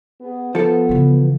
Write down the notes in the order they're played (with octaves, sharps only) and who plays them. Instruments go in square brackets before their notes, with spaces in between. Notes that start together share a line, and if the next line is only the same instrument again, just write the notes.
[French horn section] B3 G#4
[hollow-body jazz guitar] F3 A4 [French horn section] B3
[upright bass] C#3 E3